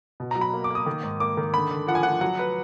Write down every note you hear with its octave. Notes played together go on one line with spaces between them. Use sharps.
B2
A#5
F#3
B5
A#3
D6
A#3 D#6
D#3
G#2
A#3 D6
D#3
D3 B5
D3
F3 F#5
G#5
F3 F#5
F#3 F#5
B4